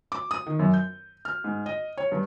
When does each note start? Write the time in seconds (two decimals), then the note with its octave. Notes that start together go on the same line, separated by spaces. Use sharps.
0.12 D6
0.31 D#6
0.47 D#3
0.59 F#2
0.74 G6
1.25 F6
1.44 G#2
1.66 D#5
1.98 C#5
2.12 G2